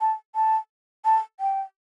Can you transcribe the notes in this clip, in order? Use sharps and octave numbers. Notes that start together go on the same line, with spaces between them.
A5
A5
A5
G5